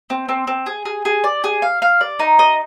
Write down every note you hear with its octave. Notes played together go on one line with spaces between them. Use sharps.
C4
C4
C4
G#4
G#4
G#4
D5
G#4
F5
F5
D5
D#4
D#5